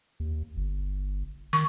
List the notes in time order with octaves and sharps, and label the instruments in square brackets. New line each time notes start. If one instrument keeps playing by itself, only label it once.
[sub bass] D#2
G1
[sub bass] D#3 [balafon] C#6